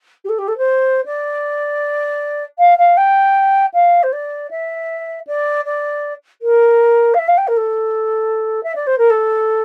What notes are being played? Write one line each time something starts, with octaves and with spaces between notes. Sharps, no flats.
G4
A4
G4
A4
C5
D5
F5
F5
G5
F5
C5
D5
E5
D5
D5
A#4
F5
E5
F5
G5
A#4
A4
E5
D5
C5
A#4
A4